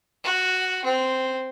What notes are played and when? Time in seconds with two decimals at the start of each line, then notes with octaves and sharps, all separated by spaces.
0.24 F#4
0.84 C4